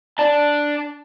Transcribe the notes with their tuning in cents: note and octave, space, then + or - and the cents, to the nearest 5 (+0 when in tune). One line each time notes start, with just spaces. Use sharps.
D4 +0 A5 +0